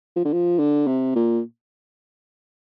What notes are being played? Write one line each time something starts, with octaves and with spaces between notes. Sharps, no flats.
F3
D3
F3
D3
C3
A#2